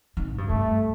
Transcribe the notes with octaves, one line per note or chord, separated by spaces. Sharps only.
D#3
A2
G2
G2 A3